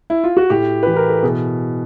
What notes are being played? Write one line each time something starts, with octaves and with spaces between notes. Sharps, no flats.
E4
F4
F#4
A2 G4
E3 B4
A#4
A4
B2 G#4